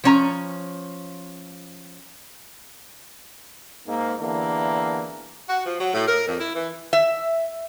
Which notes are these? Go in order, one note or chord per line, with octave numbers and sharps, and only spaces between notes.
F3 C#4 A#5
G#2 A#3
E2 D3 E3 A#3
F#4
F3
F#3
A2
A#4
F2
E4
E3
E5